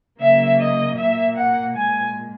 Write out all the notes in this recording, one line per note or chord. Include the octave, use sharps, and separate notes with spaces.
C#3 F#3 A#3 E5
D#5
A#2 A#3 E5
F#5
A#2 G#3 G#5